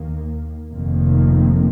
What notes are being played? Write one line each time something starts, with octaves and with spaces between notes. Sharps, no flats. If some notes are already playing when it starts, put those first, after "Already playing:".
Already playing: D#2 D#3 A#3
F1 F2 D#3 A#3